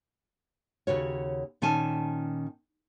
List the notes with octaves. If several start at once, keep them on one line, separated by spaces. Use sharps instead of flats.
D#2 C#3 F#4 C#5
A#2 D#3 C#4 G#5 A5